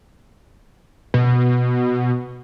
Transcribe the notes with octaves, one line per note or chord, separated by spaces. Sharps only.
B2